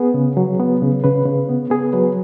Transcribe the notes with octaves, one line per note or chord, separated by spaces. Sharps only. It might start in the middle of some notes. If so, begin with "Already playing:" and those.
Already playing: B3 G#4
C#3
F#3
B3
C#3
C#3 B4
C#3
B3
B3 G#4
F#3 B4